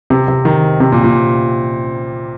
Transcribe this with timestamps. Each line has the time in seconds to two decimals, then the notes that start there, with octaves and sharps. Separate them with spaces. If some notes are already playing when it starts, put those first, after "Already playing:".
0.10 C3
0.28 C3
0.45 D#3
0.80 C3
0.92 A#2
1.04 A#2